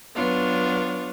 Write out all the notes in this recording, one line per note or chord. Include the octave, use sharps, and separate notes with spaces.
F#3 B3 D4 F4 C#5